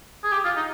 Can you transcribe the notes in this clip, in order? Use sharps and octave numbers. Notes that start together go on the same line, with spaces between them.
G#4
G4
F4
D#4